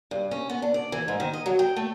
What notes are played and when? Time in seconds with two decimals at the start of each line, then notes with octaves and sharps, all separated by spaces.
0.11 G2
0.31 C#4
0.50 B3
0.62 D4
0.74 D5
0.92 E3
1.08 G#2
1.20 D#3
1.33 D#5
1.46 F#3
1.59 G5
1.77 A3